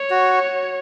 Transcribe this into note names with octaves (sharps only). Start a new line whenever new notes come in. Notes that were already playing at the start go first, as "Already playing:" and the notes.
Already playing: C#5
F#4